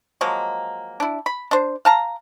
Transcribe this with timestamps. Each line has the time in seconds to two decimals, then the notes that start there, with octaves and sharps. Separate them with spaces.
0.21 F3 F#3 G#3 A#3
1.00 D4 E4
1.26 B5
1.51 D4 C5
1.85 F5 A5 A#5